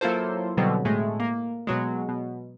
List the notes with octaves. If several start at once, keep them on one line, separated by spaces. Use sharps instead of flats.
F#3 A#3 E4 F4 A4 C5
B2 D3 F#3 G3 B3 C4
A2 G#3 A3
A#3
B2 F#3 G#3
B2